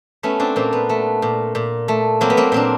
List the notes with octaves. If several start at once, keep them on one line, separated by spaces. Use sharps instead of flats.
A3 B3 C#4
C4 D4
A#2 A#3 C4
B3
A3
A#2
A#2
A3
F#3 A#3 C4
B3
A#3 C4
A#2 C4 D4